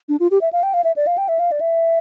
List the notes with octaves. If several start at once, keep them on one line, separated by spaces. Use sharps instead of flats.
D4
F4
G4
E5
F5
G5
F5
E5
D5
F5
G5
E5
F5
D5
E5